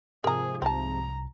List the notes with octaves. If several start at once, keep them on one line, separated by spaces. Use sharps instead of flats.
G#2 C3 F3 G#4 A#4 A#5
C2 C4 A5 A#5